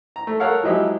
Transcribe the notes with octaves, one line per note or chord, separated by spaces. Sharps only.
A#5
A3
A4 A#4 C#5 F5 F#5
F3 F#3 G#3 E4 G4